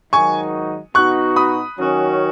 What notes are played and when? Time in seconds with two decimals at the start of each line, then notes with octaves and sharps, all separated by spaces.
0.13 G#2 D#3 F#3 D#4 F#4 G#5 C#6
0.95 B2 B3 D#4 F#4 C#6 F#6
1.36 B5 D#6
1.77 D#3 F#3 C#4 F#4